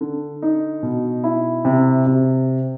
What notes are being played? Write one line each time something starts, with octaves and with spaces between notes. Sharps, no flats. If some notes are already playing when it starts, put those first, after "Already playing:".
D3
D#4
B2
E4
C3
C3